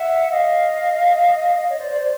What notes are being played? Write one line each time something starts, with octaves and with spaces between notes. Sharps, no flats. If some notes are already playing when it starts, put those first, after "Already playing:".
Already playing: E5 F#5
D#5 F5
D#5 F5
C#5 D#5
C5 D5
C5 D5
C5 D5